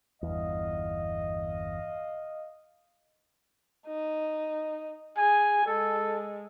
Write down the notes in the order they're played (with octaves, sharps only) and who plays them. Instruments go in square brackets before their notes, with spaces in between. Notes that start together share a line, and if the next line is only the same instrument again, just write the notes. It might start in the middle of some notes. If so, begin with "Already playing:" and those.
[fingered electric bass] G1 E2 [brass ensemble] D#5 F5
[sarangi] D#4
[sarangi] G#4 [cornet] G#5
[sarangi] G#3 [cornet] A4